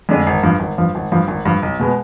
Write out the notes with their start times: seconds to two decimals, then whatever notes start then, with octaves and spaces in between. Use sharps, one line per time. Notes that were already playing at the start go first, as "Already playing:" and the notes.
0.09 F2 D3 G#3 D4
0.27 G#1
0.43 G2 F3
0.60 G#1
0.78 G2 F3
0.95 G#1
1.12 G2 F3
1.28 G#1
1.45 G2 F3
1.63 B1
1.79 B2 G#3 B3